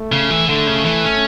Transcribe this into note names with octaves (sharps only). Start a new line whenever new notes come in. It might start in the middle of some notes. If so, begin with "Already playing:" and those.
Already playing: A3
C#3
E3
D3 A3
C#3
E3
C#4